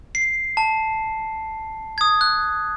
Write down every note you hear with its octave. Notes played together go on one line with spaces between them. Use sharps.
C7
A5
D#6 G#6
F#6